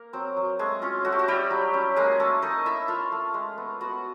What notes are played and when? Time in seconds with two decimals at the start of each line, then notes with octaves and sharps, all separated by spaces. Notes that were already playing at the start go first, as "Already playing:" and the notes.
Already playing: A#3 A#4
0.13 F#3 C4 C5
0.37 F#3
0.59 G#3 A3 G#4
0.82 C#4 F4
1.05 A3 F#4
1.12 G4
1.19 F#4
1.28 G3 E4 G4
1.51 F#3
1.74 C#4
1.96 G#3 A#3 G#4
2.20 A3 A#3 A4
2.42 A3 D#4 D#5
2.65 A3 E4 E5
2.88 A3 F4 F5
3.12 A3
3.34 G#3
3.58 B3
3.81 B3 F#4 F#5